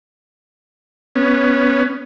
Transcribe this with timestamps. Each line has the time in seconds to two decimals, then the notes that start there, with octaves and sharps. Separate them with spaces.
1.15 B3 C#4